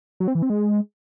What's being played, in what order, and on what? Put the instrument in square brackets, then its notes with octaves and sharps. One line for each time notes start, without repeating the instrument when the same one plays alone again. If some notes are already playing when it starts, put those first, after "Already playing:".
[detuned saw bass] F#3
C4
E3
C4
G#3